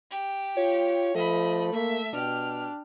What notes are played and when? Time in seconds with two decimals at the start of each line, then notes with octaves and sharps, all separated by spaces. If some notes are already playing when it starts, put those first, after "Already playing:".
0.11 G4
0.57 F4 C#5
1.15 F3 A3 D#5 B5
1.73 A#3 E5
2.13 B2 D4 G4 F6